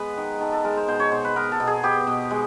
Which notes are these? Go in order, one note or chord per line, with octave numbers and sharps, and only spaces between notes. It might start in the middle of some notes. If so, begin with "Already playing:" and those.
Already playing: G#3 B3 B4
D#3
D#3 A4
A4
G#3 A#4
C5
B2 C5
C#5
B2 C5
B4
B3 A#4
A4
B2
G#4
B3 G4
B2
G#3